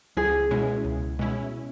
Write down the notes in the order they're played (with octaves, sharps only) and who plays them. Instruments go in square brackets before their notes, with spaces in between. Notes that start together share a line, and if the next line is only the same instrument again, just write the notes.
[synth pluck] C#2 [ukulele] G#4
[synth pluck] B2 G#3 C#4 E4
C#2
B2 G#3 C#4 E4